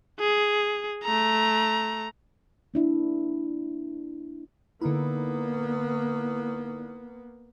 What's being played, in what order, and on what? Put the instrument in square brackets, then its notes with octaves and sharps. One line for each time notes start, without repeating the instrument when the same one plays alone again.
[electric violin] G#4
A3 A#5
[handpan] A#3 D4 E4
[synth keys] D3 D#4 E4 [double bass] A#3 B3